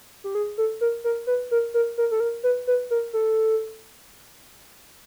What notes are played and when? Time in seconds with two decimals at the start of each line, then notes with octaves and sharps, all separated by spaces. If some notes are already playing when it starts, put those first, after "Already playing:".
0.24 G4
0.35 G#4
0.58 A4
0.81 A#4
1.04 A#4
1.27 B4
1.51 A#4
1.74 A#4
1.98 A#4
2.11 A4
2.20 A#4
2.43 B4
2.67 B4
2.90 A#4
3.13 A4